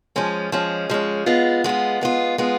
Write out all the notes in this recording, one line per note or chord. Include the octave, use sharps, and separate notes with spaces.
F3 G#3 C#4
F3 G#3 C#4
F3 G#3 C#4
G#3 B3 F4
G#3 B3 F4
G#3 B3 F4
G#3 B3 F4